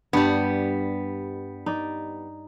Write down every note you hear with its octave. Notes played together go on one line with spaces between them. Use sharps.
G2 G3 B3
D#4 D5